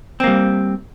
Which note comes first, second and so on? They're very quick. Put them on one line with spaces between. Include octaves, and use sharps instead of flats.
C4 A#3 G3